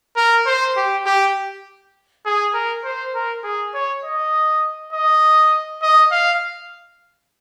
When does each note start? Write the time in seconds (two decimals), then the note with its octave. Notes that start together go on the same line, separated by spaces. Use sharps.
0.17 A#4
0.47 C5
0.77 G4
1.06 G4
2.25 G#4
2.54 A#4
2.84 C5
3.14 A#4
3.44 G#4
3.74 C#5
4.04 D#5
4.93 D#5
5.82 D#5
6.11 F5